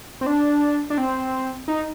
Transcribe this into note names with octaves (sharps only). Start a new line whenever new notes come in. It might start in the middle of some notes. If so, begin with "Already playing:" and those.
C4
D4
D4
C4
D#4